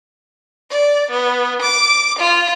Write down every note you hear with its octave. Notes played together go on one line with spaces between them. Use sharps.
D5
B3
D6
F4